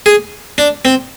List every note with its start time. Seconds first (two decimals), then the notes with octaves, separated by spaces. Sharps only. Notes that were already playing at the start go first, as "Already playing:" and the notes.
0.06 G#4
0.58 D4
0.85 C4